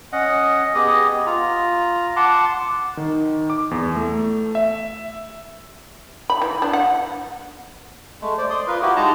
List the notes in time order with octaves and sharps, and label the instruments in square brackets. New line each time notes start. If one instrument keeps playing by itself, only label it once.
[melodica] C#4 D#5 F#5
B3 G4 G#4 D#5
F4 A#5
F#5 A5 C6 D6
[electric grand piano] D#3
D6
E2
A3
E5
[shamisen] B5
E3
D4
F#5
[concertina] G#3 A3
C5 D5
D5 C6 D#6
F4 A#4 B4
E4 F#4 G4
G#3 D#4 D#5 A5 A#5